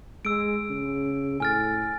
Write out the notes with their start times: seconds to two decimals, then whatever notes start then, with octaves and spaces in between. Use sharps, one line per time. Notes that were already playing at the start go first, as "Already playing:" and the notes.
0.25 G#3 E6 D7
0.70 C#3
1.40 A2 G#5 F6 A6